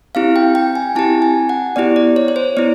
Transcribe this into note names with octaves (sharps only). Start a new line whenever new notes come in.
C4 E4 G4 F5
G5
G5
G#5
C4 E4 G4 A5
G#5
F#5
B3 E4 G4 D5
D5
C#5
C#5
C5
B3 E4 D5